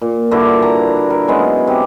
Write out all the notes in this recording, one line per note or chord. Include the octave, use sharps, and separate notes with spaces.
A#2
G2 D3 E4 F#4
A#5
A#4
F#3 G#3 B3 C#4
C3 G4